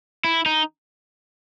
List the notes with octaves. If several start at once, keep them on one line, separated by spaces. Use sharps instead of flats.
E4
D#4